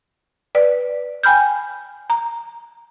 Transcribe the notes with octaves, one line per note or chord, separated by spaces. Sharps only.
B4 D5
G5 G#5 B5 F6 G6
A#5